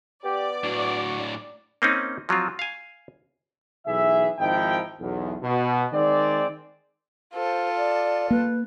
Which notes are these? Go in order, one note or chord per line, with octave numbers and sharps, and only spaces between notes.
B3 G4 D5
A2 D4 F#4
A#3 C4 C#4 D#4
F3 F#3 C4 F4
F5 G#5
B1 E3 G#4 E5
G#1 F3 D#4 E4 G5
B1 E2
B2
D#3 G#3 C4 D5
F4 A4 C5
D5
A#3 B4